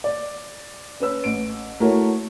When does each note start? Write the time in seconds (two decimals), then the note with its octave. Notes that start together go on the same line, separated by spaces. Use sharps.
0.04 D5
1.00 C#4 B4 E6
1.24 A1 D7
1.80 A3 E4 F#4 A#4 C#5